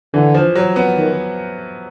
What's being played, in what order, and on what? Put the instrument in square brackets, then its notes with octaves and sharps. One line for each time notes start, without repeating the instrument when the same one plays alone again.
[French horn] D3 [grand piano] E3
[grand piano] F3
F#3
B3
[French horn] D#3